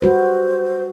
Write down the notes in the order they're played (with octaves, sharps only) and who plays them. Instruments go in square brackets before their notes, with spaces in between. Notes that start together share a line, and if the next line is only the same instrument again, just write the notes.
[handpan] G3 F#4 B4 [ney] C5